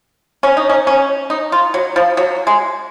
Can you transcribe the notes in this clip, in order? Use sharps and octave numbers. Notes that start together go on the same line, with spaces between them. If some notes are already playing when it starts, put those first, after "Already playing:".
C#4
D#4
C#4
C#4
D#4
F4
F#3
F3
F#3
G#3